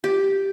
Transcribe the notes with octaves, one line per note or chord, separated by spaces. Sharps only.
G4